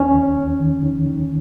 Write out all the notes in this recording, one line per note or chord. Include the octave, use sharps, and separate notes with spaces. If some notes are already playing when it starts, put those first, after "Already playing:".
Already playing: D#2 C#4
D#2
D#2
D#3
D#3
D#3